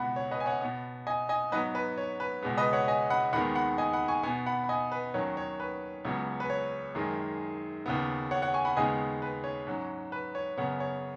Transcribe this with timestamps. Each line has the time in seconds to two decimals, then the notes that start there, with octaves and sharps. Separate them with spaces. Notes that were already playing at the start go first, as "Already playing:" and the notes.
Already playing: C#2 B2 B3 F#5 B5
0.16 C#5
0.31 B4 D#5
0.40 G#5
0.46 C#5 F#5
0.61 B2 B3
1.07 D#5 G#5
1.29 D#5 G#5
1.52 G#2 F#3 B3 B4 D#5
1.75 B4
1.98 C#5
2.20 B4
2.42 C#2 B2 G#3 B3
2.57 B4 D#5
2.73 C#5 F#5
2.88 D#5 G#5
3.10 F#5 B5
3.33 D#2 D#3 G#3 B3 F#5 B5
3.55 F#5 B5
3.78 D#5 G#5
3.93 F#5 B5
4.08 G#5 C#6
4.23 B3 G#5 C#6
4.26 B2
4.46 F#5 B5
4.64 B5
4.69 D#5 G#5
4.92 B4
5.14 D#2 D#3 F#3 C#4 C#5
5.37 C#5
5.60 B4
6.05 C#2 C#3 F#3 B3
6.40 B4
6.50 C#5
6.95 F#2 D#3 G#3
7.86 D#2 C#3 B3
8.31 C#5 F#5
8.42 C#5 F#5
8.54 G#5 C#6
8.65 F#5 B5
8.76 D#2 C#3 G#3 B3 D#5 G#5
9.22 B4
9.44 C#5
9.67 G#2 F#3 C#4
10.12 B4
10.35 C#5
10.57 F#2 C#3 B3 C#5 F#5
10.80 C#5